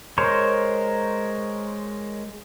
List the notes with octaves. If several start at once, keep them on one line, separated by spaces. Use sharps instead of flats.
G#3 A#4 C5 C#5